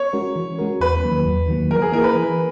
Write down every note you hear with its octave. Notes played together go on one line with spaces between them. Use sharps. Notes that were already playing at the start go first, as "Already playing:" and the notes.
Already playing: C#5
G#3 C#4 F#4 A#4
E3
G#3 C#4 F#4 A#4
E2 B4
D#3 F#3 A#3
E2
D#3 F#3 A#3
E3 A#4
G#4
A#3 E4 A#4
B4
E3